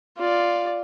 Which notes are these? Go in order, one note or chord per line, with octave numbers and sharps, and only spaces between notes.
F4 D5